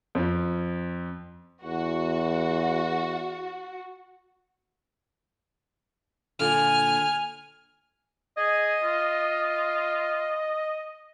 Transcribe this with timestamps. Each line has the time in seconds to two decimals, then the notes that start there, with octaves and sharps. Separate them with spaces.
0.15 F2 F3
1.64 E2 F#4
6.39 A#2 D3 F4 G#5 F6
8.37 G#4 D#5
8.84 F4